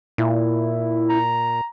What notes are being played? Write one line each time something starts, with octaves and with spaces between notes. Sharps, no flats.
A#2 E4
A#5